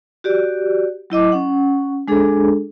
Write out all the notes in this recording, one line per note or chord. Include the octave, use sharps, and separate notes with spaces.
F#4 G4 D5
F#3 E4 D#5 D6
C#4 F#5
G#3 D4 G#4 A4